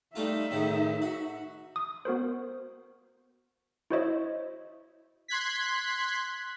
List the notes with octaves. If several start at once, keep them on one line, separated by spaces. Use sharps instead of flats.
G3 A3 D#4 F4 E5
D#2 A2 C#3
F#4
D#6
B3 F#4 A#4 C5
E4 F#4 C5 C#5 D#5 E5
C6 F#6 G#6 B6